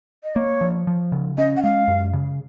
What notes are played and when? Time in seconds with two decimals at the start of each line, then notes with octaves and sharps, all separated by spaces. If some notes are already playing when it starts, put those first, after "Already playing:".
0.24 D#5
0.35 A#3 C#5
0.61 F3
0.87 F3
1.12 C#3
1.38 C#4 D#5
1.57 F#5
1.63 G#3 F5
1.88 F#2
2.13 C#3